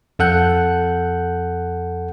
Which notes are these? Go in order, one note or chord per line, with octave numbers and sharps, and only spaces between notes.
F2 A4 F#5 F#6 G6